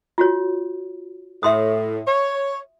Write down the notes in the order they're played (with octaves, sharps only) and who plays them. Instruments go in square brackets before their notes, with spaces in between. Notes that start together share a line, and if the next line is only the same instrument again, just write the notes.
[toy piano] F4 F#4 C#5
[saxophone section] A2 [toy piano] E5 C6 D#6
[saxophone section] C#5